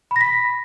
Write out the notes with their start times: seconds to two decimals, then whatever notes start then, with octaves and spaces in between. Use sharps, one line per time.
0.11 B5
0.16 A#6
0.21 B6